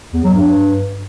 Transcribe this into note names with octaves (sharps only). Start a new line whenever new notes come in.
E2
F#3
G2